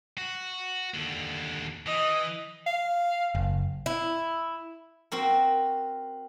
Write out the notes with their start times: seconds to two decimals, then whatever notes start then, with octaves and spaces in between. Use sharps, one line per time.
0.18 F#4
0.94 D#2 D3
1.86 E3 D#5
2.66 F5
3.35 F#1
3.86 E4
5.12 C4 F#4 A#4